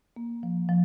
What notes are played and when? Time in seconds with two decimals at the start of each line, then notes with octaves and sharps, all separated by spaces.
0.16 A#3
0.43 F3
0.69 F3